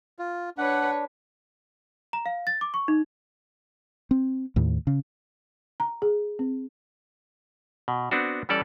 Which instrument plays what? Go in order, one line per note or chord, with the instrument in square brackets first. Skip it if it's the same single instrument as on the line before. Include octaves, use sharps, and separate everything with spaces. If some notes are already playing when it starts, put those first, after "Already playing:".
[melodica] F4
[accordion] D4 [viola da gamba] B4 C#5 [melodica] F#5
[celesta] A#5
F5
A6
D6
C#6
D#4
[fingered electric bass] C4
D#2 A2
C#3
[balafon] A#5
G#4
C4
[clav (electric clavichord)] B2
B3 C4 D4 F#4
E3 G3 C#4 A4 D5